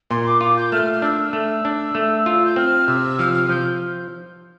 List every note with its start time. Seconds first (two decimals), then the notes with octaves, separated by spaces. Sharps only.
0.10 A#2 C6
0.26 D6
0.41 F4 D6
0.57 G6
0.72 A3 F6
0.92 F6
1.02 D4 E6
1.33 A3
1.65 D4
1.95 A3
2.26 F4
2.46 G6
2.56 C4 F6
2.88 C3 E6
3.19 F3 F6
3.34 F6
3.49 F3 G6